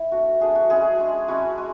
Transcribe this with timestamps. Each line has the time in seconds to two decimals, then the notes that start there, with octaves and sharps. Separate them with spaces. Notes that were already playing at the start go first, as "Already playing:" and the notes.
Already playing: E4
0.11 A3 D4 F#4
0.40 F#3 A3 D4 G#4
0.55 F#4
0.70 G#3 C#4 E4 G#4
0.99 G#3 D4
1.28 G#3 C#4 E4 F#4
1.58 G#3